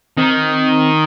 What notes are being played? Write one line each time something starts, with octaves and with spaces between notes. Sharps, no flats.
D#3 C4